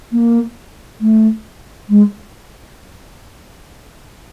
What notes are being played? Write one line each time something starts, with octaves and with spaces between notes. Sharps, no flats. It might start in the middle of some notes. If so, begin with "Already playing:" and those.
A#3
A3
G#3